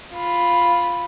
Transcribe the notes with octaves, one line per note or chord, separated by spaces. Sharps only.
F4 B5